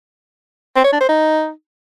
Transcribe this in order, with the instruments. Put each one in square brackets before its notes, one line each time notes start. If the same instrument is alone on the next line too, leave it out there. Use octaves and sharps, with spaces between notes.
[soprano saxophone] C4
C#5
D4
C5
D#4